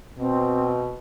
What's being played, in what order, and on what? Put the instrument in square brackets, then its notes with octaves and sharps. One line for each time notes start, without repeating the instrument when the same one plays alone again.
[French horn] B2 [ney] C4